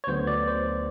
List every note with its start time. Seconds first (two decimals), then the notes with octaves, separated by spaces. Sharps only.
0.04 C#5
0.07 D2 D3 F#3 B3 C5
0.27 D5
0.48 C5